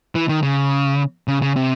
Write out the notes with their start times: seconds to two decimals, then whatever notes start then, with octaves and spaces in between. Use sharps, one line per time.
0.15 E3
0.29 D#3
0.43 C#3
1.28 C#3
1.42 C#3
1.56 C3